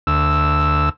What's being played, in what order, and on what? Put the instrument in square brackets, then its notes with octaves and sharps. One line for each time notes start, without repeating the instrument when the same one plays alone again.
[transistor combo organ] D2 E6